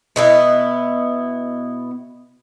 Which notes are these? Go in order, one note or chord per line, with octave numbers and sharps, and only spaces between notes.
B2 B3 E4